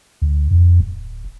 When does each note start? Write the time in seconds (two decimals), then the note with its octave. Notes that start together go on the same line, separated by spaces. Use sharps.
0.22 D2
0.51 F2
0.80 D1